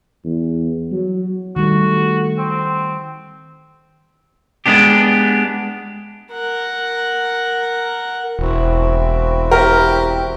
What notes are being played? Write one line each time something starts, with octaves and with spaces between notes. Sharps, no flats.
E2
F#3
D#3 G3 A3 F#4
C4
G#3 B3 D4 G4
A#4 F#5
E1 C4 E4 F#4
G4 A#4